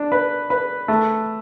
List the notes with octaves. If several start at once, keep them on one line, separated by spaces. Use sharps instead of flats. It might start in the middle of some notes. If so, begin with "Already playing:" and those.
Already playing: D4
B4
B4
A3